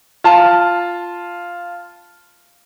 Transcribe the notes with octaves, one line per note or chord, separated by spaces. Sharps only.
F4 A5